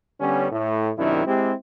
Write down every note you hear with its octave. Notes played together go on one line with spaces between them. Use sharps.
D3 G3 B3 C#4
A2
F#2 C3 D#3 D4 E4
G#3 C4 E4 G4